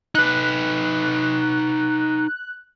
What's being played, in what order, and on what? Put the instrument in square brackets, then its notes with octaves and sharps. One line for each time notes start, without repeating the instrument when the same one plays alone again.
[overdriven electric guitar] D#4 B4 [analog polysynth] F#6